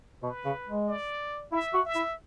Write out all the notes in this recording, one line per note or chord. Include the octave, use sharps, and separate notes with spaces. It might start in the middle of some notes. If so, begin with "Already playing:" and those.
B2 B4
C#3
G#3
D5
E4 E5
F#4
E5
E4